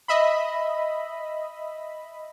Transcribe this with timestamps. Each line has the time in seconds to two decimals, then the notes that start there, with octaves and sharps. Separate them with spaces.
0.08 D#5 E5 B5